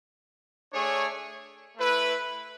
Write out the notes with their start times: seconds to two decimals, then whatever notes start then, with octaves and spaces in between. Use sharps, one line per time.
0.72 A3 D4 G#4 C#5
1.78 A3 E4 B4